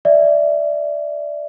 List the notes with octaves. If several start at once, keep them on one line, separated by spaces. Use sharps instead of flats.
D5 E5